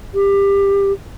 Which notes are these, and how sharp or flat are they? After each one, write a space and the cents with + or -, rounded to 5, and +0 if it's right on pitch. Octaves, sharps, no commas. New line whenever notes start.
G4 +20